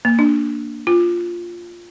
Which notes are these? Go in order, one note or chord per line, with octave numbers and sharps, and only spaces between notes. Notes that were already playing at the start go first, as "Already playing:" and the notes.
A#3
D4
F4